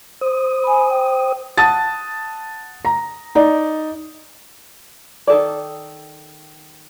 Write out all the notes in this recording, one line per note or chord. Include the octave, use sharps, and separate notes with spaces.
C5 D#6
G#5 B5
G5
F#5 A5 D#6 A6
A#5
D#4 D5
D#3 A4 D5